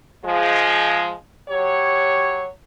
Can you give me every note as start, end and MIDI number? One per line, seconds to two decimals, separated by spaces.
0.24 1.11 53
0.24 1.11 56
1.49 2.47 54
1.49 2.47 67
1.49 2.47 73